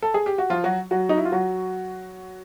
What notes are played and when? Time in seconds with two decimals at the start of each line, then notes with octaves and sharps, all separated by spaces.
0.02 A4
0.14 G#4
0.26 G4
0.38 F#4
0.50 F3 F4
0.64 F#3 F#4
0.91 F#3 F#4
1.09 D#4
1.17 E4
1.25 F4
1.32 F#3 F#4